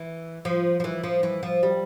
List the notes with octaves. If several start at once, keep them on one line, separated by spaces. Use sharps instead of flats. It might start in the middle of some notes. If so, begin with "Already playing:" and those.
Already playing: E3
F3
F3
E3
F3
E3
F3
G3